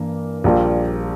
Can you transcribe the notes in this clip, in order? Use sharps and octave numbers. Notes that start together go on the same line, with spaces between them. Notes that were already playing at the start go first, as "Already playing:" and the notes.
Already playing: G2 E3 A#3
A#1 A#2 G3 A#3 F4